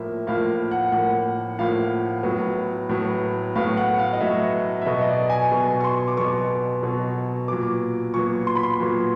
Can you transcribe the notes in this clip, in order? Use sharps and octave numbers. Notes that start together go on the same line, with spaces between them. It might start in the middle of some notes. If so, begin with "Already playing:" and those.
Already playing: A2 F3 A#3 E5
A2 F3 A#3 F5
F#5
A2 F3 A#3 F#5
A2 F3 A#3 F5
A2 F#3 B3
A2 F#3 B3
A2 F#3 B3 F5
F#5
F5
D#5
A2 F#3 B3 E5
E5
B2 F#3 B3 D#5
D#5
D5
G#5
B2 F#3 B3
C#6
C6
D6
B2 F#3 B3 C#6
B2 F#3 B3
A#2 F#3 B3 D6
A#2 F#3 B3 C#6
C6
B5
C6
A#2 F#3 B3